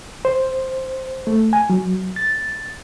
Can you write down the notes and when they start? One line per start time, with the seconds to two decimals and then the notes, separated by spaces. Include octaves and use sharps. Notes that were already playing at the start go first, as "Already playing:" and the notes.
0.25 C5
1.27 A3
1.53 G#5
1.70 F#3
2.16 A6